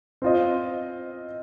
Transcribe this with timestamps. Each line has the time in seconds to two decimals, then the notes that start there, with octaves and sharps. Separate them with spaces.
0.22 C4 F4 C5 D#5